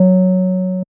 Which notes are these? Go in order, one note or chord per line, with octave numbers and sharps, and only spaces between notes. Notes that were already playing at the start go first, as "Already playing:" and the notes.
Already playing: F#3